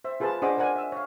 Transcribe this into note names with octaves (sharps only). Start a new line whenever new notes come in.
C5 E5
F4 G#4 B4 C5 A5
D4 G#4 C5 D#5 F#5 D6
A#4 C5 D5 F#5 G#5
E5 E6
C#5 F5